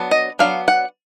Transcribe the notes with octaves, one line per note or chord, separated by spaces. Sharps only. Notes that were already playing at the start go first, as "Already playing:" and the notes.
Already playing: F#3 B3 D4
D#5
F#3 B3 D4 F5
F#5